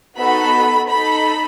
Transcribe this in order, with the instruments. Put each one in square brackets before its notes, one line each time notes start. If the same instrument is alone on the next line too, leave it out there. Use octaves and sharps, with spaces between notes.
[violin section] B3 D#4 F#4 A4 B5
D#4 A4 B5